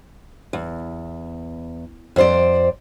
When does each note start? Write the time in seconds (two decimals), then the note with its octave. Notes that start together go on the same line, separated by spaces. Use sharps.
0.53 E2
2.16 F2 C5 D5